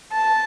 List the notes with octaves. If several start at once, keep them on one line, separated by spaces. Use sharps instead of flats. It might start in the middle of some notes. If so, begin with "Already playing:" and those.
A5